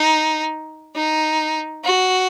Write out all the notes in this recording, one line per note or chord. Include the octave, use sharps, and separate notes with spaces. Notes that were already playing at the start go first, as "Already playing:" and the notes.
Already playing: D#4
D#4
F#4